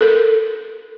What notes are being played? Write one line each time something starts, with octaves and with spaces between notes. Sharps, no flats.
A4 A#4